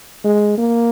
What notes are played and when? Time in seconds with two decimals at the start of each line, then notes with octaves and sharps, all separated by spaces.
0.24 G#3
0.58 A#3